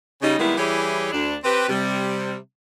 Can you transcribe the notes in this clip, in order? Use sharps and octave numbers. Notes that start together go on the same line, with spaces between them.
C#3 G3 D#4
D#3 G3 G#3 A#3 B3 E4
E3 G3 E4 G4 G#4 C#5
D2 D4
C4 G4 B4
C3 G3